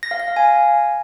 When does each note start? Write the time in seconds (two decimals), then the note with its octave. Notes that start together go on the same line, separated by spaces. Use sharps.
0.03 A#6
0.11 F5
0.20 A#6
0.28 F5
0.36 G#5